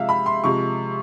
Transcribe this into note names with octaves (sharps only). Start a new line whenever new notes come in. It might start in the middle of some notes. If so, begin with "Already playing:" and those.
Already playing: C3 F3 G#3 E5 F5
B5
C6
C3 F3 G#3 C#6